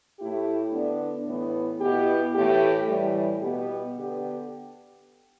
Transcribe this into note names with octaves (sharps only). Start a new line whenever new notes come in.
A2 A3 E4 G4
D3 B3 D4
A2 E3 B3
B2 B3 E4 G4
A2 E3 A3 G4
A2 E3 G3
B2 B3 G4
D3 B3 G4